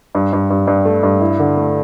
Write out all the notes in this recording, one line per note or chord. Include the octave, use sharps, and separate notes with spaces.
G2
G2
G2
G2
A3
G2
E4
D3
A3